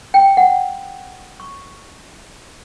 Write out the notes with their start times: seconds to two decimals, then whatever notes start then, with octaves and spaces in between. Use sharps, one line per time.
0.14 G5
0.37 F#5
1.40 C#6